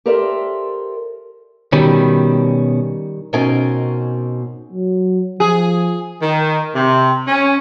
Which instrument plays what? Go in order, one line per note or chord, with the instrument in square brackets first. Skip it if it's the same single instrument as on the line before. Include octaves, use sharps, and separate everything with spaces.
[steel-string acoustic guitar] G4 A4 A#4 C5 D5 E5
[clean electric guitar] B2 C#4 [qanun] D#3 G3 E5
[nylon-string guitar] B2 C4 C#4 D#4 A#4 G#5
[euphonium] F#3
[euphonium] F3 [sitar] G#4
[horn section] D#3
C3
C#4